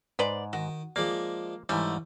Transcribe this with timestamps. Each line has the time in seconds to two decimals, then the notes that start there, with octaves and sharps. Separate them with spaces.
0.19 G#2 B4 C5 D5
0.53 D#3 F#4
0.96 F3 G#3 A#3 D5
1.69 G#2 E3 G3 A3 C#4